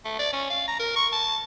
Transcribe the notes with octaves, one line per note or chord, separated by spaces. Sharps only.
A3
D5
C#4
F5
A#5
A#4
C#6
A5